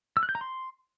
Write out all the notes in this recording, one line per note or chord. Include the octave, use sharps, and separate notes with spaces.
E6
F#6
G6
A#5
C6